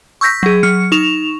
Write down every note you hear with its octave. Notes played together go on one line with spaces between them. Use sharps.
C#6 E6 G6 A#6 B6
F#3 G#4
F#3 F6 C#7
D#4 C#6 E7 F7